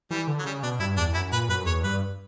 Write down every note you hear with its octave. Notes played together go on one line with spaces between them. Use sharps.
E3 G3
D3
F#3
C#3 G3
B2 D4
G2 E4
E2 D4
F#2 E4
A#2 B4
F#2 B4
E2 C#5
G2 B4